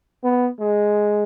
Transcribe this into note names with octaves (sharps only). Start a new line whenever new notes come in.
B3
G#3